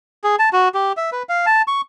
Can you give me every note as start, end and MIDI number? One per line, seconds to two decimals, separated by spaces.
0.24 0.36 68
0.39 0.49 81
0.53 0.68 66
0.74 0.93 67
0.97 1.10 76
1.12 1.23 71
1.29 1.46 77
1.46 1.62 81
1.67 1.81 85